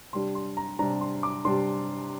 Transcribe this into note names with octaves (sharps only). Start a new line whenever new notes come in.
C3 G3 D4 C6
C6
A#5
C3 G3 D4 A#5
C6
D6
C3 G3 D4 C6